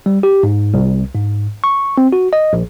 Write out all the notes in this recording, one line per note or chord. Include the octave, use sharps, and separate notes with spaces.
G3
G4
G#2
C2
G#2
C#6
C4
F#4
D#5
A#1